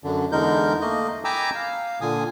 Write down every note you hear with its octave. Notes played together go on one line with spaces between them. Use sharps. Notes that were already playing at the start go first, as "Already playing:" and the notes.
F#2 D3
E2 D3 G#3 D#4 A#4 G6
A3 A#3 D#5
G5 G#5 A#5 B5 D6 E6
F5
A#2 D3 G#5 D#6